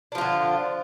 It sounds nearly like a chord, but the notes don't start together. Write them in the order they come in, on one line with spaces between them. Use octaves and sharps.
D4 F3 F4 D3